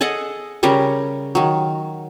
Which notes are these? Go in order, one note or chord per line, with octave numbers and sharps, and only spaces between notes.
G#4 A4 D#5 F#5
C#3 G3 A#4 C#5
D#3 F#3